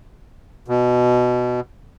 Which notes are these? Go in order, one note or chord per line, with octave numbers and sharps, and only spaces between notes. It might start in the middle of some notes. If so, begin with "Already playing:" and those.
B2